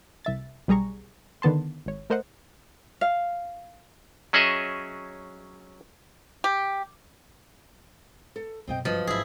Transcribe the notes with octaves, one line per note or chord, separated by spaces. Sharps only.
C2 E5 A6
B1 G3 G#4 A#5 C#6
D3 D#3 B3 A5 C6
G#1 C#5
A3 A#4 C5 D#5 F#5
F5
F#3 C#4 G#4 D#5 E5
G4
A4
F#2 B2 C4 D#5 G5
G1 F3 F#3 B4 D#5
G#1 E4 G#4